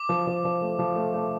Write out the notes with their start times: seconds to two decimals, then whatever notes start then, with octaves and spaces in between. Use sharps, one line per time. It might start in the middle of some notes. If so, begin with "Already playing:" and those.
Already playing: D6
0.09 F3
0.27 F3
0.45 F3
0.62 A3
0.79 F3
0.96 A3
1.14 A3